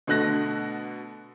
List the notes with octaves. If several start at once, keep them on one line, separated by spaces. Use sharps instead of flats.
B2 D3 A3 F#6 A#6